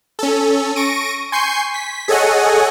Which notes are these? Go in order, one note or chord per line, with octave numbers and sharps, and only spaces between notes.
C#4 A4
C#6 A#6 D7 D#7
G#5 C6 C#6 G6 C7
B6
G#4 A4 C#5 D#5 F#5 G#5